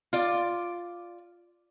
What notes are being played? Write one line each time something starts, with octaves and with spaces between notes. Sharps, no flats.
F4 D5